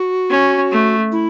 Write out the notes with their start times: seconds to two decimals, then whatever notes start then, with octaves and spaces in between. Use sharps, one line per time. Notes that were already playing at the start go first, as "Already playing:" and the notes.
Already playing: F#4
0.30 C#4
0.71 A3
1.12 E4